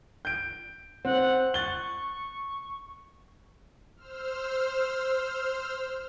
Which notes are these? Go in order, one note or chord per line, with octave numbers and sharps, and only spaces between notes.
G6 D7
C4 F#5
C#6 F#6 A6 G7
C5 E6 F6